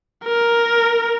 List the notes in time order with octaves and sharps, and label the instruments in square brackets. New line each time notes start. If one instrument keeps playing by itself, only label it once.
[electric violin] A#4